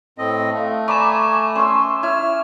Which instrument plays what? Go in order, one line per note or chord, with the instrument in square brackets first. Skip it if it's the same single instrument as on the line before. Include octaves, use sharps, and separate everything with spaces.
[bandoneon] A2 C4 D#5 [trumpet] A4
[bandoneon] A3 [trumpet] F5
[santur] D5 A#5 B5 [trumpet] G#5 [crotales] C#6 D6 E7
[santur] C#4 E6 [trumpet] C6
[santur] E4 [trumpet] C#5 [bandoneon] F6